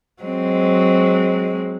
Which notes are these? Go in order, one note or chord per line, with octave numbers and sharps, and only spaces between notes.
F#3 G#3 C4